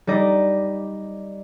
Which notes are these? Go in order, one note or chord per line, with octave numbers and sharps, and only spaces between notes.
G3 D#4 D5 D#5